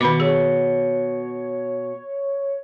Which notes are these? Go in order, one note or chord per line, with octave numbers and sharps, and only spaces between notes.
B2 D#3 B5 D6
G#4 C#5